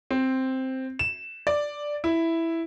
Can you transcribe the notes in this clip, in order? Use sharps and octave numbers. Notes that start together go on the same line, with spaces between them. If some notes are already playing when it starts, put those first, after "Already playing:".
C4
E7
D5
E4